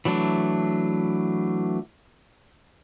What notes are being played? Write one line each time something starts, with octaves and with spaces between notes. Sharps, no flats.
E3 F#3 A3 D4